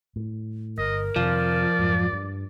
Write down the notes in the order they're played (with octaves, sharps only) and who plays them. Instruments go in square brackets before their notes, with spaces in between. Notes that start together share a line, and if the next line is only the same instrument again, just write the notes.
[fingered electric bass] A2
[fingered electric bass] G1 [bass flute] A#4 [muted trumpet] D#5
[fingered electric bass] F2 C3 D#3 [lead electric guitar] F3 [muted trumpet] D5
[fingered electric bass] F2 G#2 F#3
G2